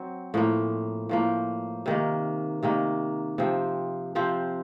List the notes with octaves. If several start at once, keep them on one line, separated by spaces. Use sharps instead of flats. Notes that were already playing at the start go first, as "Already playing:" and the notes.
Already playing: F#3 C4
A2 F3 A#3
A2 F3 A#3
C3 D#3 A#3
C3 D#3 A#3
C3 F3 C4
C3 F3 C4